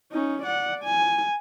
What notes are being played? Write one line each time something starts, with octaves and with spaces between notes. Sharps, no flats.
C#4 D#4
D5 F#5
G#5